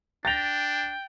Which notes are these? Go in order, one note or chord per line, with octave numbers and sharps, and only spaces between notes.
D4 G5 A6 A#6 F7